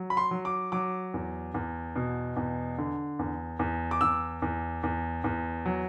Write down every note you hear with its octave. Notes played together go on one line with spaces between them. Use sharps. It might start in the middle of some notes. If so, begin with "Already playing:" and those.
Already playing: F#3
B5
C6
F#3
D6
F#3 D6
E2
E2
B2
E2
D3
E2
E2
D6
E2 E6
E2
E2
E2
F#3